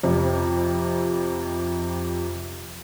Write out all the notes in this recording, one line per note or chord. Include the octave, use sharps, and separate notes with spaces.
F2 C3